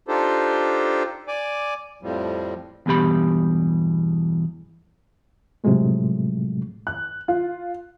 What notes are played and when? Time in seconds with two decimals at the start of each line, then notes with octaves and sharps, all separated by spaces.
0.08 D4 D#4 F4 G4 A4 C5
1.28 D5 G#5 D6
2.02 F2 A2 F3 G3
2.86 E2 G2 B2 G4 B5
5.64 A2 C3 F3 F#3 G#3 A3
6.87 F#6
7.28 F4